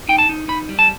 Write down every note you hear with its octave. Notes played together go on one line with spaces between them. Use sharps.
D#4 G5
A5
D#4
D#4 B5
G3
A5